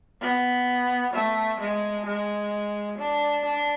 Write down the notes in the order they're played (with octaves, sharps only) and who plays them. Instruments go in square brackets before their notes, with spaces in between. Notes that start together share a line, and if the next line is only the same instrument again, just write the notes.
[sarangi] B3
A3
G#3
G#3
D4
D4